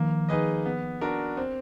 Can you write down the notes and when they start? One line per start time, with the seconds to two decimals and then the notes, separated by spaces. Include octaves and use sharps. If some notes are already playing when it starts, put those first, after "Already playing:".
Already playing: D#3 F3 A#3
0.29 D#4 G#4 B4 D#5
0.66 B3
1.01 D4 F#4 A#4
1.37 C4